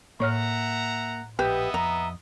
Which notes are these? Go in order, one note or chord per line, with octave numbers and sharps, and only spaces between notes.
A2 A#3 C#5 E5 F#5 A#5 F6
A#1 B3 G4 B4 D#5 E5
F2 A#5